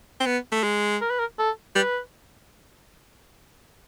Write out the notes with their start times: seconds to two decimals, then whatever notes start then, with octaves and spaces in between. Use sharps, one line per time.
0.20 C4
0.26 B3
0.52 A3
0.63 G#3
1.02 A#4
1.10 B4
1.19 A#4
1.39 A4
1.75 G3 B4